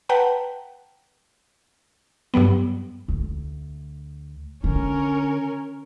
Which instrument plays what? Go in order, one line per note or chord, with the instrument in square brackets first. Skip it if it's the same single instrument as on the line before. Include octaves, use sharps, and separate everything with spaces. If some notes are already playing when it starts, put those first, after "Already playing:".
[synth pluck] B4 F#5 G5 A5 A#5
G2 F#3 G3 B3
[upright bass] D2
[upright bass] D3 [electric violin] C#4 A#4